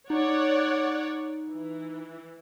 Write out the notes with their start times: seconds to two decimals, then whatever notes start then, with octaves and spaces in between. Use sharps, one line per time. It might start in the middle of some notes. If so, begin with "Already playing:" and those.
0.10 D#4 C#5 D5 F#5
1.49 E3